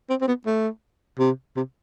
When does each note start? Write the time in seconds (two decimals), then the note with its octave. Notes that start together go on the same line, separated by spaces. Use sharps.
0.10 C4
0.21 C4
0.28 B3
0.46 A3
1.19 C3
1.56 C3